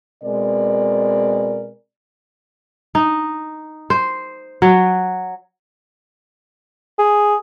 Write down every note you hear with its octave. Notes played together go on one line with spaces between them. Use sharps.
B2 G#3 C4 A#4 D5
D#4
C5
F#3
G#4